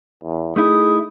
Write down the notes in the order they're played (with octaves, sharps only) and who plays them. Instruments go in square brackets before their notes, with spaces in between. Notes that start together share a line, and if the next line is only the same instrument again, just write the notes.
[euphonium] E2
[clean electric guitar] A3 D#4 E4 [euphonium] G#4 [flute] D#6